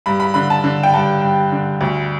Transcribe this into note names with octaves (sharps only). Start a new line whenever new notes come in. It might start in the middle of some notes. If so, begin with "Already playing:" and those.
G2 B5
B5
D3 B5
A5
D3
G5
G2 A5
G2
D3
D2